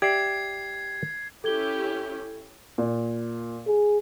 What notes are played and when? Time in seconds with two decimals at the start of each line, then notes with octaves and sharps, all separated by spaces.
0.02 G4 D5 E5 G#6 C7
1.44 C#4 E4 G4 A4 G#6 G7
2.78 A#2
3.67 G#4